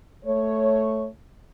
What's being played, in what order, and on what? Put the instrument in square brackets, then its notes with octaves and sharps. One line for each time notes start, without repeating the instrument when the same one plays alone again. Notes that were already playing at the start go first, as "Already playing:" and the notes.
[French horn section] A3 C#5